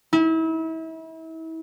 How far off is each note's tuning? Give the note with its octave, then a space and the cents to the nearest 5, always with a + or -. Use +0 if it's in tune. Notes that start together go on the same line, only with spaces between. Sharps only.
E4 -35